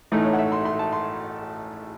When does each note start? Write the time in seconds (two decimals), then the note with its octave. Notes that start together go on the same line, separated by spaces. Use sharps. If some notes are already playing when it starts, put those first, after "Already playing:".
0.12 A1 A2 E3 A3 D#4
0.25 C#5
0.33 F#5
0.38 E5
0.52 C6
0.65 C6
0.79 A5
0.92 C6